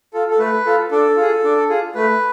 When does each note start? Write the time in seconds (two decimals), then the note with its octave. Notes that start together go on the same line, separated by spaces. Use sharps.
0.14 F4 A4
0.31 A4
0.39 A3 B4
0.65 F4 A4
0.91 D4 A4
1.17 F4 G#4
1.44 D4
1.69 F4 G#4
1.95 A3 B4